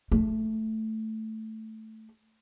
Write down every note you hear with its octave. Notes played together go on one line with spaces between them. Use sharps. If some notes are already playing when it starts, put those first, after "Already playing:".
A3